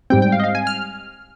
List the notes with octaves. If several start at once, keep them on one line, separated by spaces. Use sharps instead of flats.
G#2 G3 C4 G5
G5
F5
D#5
F5
G#5
F6